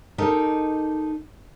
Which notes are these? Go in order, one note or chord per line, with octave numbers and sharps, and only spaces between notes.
D#4 G4 A4 A#4 D#5